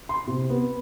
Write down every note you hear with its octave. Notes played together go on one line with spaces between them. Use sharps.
C6
C3
B3